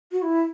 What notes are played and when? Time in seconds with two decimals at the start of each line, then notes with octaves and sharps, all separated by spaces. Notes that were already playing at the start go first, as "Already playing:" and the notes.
0.12 F#4
0.22 E4